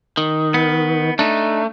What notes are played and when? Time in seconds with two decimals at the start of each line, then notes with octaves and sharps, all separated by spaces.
0.17 D#3
0.54 B3
1.19 A3 D4 D#4